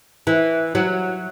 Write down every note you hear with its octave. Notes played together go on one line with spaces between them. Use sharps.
E3
F#3